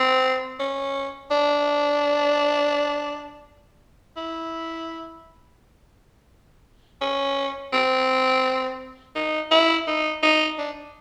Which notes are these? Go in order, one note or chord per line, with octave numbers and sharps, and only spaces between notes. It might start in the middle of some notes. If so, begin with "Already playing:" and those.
Already playing: C4
C#4
D4
E4
C#4
C4
D#4
E4
D#4
D#4
D4